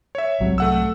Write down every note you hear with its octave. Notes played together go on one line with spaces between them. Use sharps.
C#5 E5
C2 G#2 C3 F#3
A3 F#5 E6